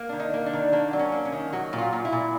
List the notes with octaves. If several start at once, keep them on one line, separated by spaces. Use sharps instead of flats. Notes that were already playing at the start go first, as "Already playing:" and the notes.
Already playing: A#3
D#3 D4
D#4
A#3
D4
D#3
A#3 D4
F#3
C#4
A#3
C#4
D#3
F#3 F#4
A#2
F4
A#2
E4
A#2